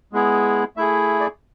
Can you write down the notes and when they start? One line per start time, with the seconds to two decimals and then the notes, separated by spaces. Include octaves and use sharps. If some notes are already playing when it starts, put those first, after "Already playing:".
0.13 G#3 B3 E4 G#4
0.77 A3 E4 G#4 E5
1.20 D5